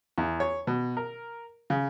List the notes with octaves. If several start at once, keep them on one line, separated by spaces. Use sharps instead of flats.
E2
C#5
B2
A#4
C#3